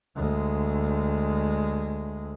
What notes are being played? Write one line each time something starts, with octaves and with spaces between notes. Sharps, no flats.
D2 G#3